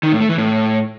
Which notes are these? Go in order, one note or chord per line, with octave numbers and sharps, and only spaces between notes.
D#3
A2
A3
E3
A2